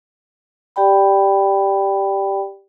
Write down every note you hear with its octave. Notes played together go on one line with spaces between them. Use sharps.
G4 D5 G5 B5